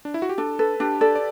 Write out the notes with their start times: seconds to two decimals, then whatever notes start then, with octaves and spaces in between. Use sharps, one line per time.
0.05 D4
0.14 E4
0.22 F#4
0.29 G4
0.38 D4 A4
0.59 A4 B4
0.80 D4 G4
1.01 A4 D5
1.15 D5